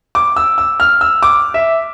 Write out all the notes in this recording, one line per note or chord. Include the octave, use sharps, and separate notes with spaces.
D6
E6
E6
F6
E6
D6
E5